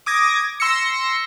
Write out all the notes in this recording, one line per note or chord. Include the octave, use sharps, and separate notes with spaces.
D6 D#6 G#6 A#6
C6 E6 A#6 C#7